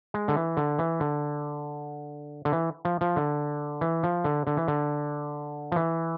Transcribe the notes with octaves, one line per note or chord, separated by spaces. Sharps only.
G#3
D3
E3
D3
E3
D3
D3
E3
F3
F3
D3
E3
F3
D3
D3
E3
D3
F3
E3